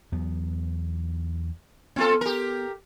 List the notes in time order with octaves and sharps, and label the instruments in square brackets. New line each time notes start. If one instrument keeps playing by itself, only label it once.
[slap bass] E2 F#3 B3
[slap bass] B3 [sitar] C4 F4 A4
[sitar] G4 A#4